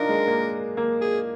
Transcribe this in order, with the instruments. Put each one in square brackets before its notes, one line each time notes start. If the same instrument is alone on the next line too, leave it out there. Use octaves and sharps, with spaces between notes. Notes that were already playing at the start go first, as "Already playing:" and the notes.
Already playing: [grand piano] D4 D#4 F4 [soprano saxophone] A#4
[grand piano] G#3
A#3
A#3
[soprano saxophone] G#4